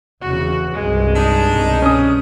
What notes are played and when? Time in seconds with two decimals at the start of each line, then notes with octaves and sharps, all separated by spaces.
0.21 F1 E2 C#3 F#4
0.74 C2 G2 G#3
1.16 D4 D#4
1.52 C2 B2
1.82 C#4 D#6